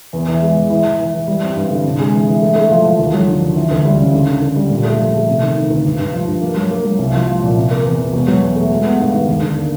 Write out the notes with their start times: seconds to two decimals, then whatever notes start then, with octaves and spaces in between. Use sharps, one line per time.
0.13 E2
0.28 E3
0.42 G#3
0.57 E3
0.70 E3
0.85 E3
0.99 E3
1.14 E3
1.28 G3
1.42 C4
1.56 G2
1.70 D3
1.84 C3
1.99 G#3
2.14 E3
2.27 E3
2.42 A3
2.56 A3
2.71 F3
2.85 F3
2.99 D#2
3.14 F#3
3.27 D3
3.41 D#2
3.56 E3
3.71 D2
3.85 G3
3.99 C#3
4.13 D3
4.28 D3
4.42 D3
4.56 G3
4.70 A#2
4.84 A3
4.99 F3
5.14 A3
5.28 C3
5.42 D#3
5.56 D#3
5.70 D2
5.85 G2
5.99 G2
6.13 F3
6.28 G2
6.42 A#3
6.57 F#3
6.71 A#3
6.84 F#3
6.99 C2
7.14 F3
7.28 F3
7.42 A#2
7.57 C3
7.71 A#3
7.85 E2
7.99 E2
8.13 B2
8.28 F#3
8.42 E2
8.56 A3
8.71 G#3
8.85 B3
9.00 G2
9.13 D#3
9.28 D#2
9.42 D3
9.57 A#3